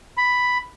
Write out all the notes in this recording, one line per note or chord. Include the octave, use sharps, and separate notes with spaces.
B5